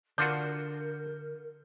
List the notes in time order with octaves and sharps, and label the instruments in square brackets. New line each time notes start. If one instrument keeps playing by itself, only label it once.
[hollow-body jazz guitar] D3 [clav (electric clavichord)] D4 F4 F#4 [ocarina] A#4 [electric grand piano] G6